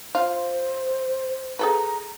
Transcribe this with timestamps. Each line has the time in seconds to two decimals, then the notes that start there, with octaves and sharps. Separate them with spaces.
0.15 F4 C5
1.59 G#4 A4 B4 A#5